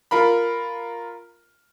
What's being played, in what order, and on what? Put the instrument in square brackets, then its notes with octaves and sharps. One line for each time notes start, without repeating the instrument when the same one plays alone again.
[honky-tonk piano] F4 A#4 B5